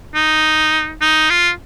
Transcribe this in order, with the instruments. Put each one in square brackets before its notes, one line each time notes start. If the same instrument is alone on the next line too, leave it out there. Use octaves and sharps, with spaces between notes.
[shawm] D#4
D#4
F4